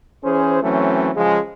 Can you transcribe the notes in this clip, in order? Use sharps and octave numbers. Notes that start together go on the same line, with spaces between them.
E3 C#4 G#4 C5
E3 F#3 A3 C4 C#4
C#3 F3 G#3